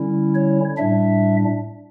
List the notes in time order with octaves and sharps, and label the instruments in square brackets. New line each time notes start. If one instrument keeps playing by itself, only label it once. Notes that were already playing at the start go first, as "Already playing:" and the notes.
Already playing: [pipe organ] D3 G3 C#4 E4
C#5
A2 G3 D4 E5